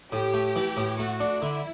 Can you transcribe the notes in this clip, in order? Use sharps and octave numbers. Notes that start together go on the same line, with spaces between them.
A2 G4
A3
E3
A2
A3 F#4
D4
D3 E4